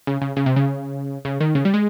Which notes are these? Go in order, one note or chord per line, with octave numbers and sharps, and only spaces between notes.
C#3
C#3
C#3
C3
C#3
C#3
D#3
C#3
G3
G#3